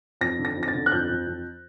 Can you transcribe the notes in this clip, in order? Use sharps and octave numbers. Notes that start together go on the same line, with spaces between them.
F2 A#6
D3
A#6
F2
A#6
A6
D3
F#6
F2 G6
F2
F2